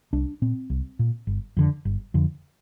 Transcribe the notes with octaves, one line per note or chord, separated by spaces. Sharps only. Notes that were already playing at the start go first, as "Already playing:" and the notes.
C2 D4
A#2 C4
C2
A#2
G1
F2 D3
G1
F2 D3